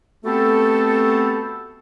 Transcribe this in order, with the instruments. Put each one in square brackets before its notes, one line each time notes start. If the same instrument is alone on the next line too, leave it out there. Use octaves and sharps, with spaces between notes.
[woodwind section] A3 B3 C4 F#4 G4 A4